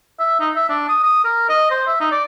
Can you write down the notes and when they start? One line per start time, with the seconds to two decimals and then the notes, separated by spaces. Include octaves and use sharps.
0.20 E5
0.40 D#4
0.56 E5
0.70 D4
0.89 D#6
1.04 D#6
1.25 A#4
1.49 D#5
1.71 C5
1.87 E5
2.00 D#4
2.12 D5